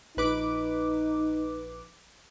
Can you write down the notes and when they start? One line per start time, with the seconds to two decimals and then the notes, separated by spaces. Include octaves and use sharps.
0.17 A#1 D#4 B4 D6